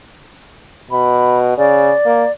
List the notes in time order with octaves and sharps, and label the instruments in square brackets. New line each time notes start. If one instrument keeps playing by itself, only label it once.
[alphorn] B2 [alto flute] B5
[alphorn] C#3 [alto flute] D5
[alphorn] A#3